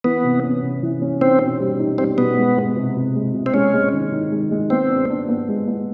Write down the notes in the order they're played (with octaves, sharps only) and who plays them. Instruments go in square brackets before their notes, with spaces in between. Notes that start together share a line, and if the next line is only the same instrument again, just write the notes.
[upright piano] E3 [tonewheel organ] B3
[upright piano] C3
C#4
C3
E3
C#4
[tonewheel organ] C4 [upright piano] D#4
[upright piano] B2
G3
D#4
[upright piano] G3 [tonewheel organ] C4
[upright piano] B2 [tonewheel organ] B3
[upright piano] G#3
G#3
C3
C3
G#3
C3
[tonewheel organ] C4
[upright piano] G#3 [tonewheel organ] C#4
[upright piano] G#3
D#3
D#3
G#3
G#3
[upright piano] B3 [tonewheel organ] C4
[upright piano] D4
D4
B3
G#3
B3